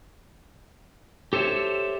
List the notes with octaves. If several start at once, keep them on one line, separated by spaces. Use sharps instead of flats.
G4 A4 C5 C#5 E5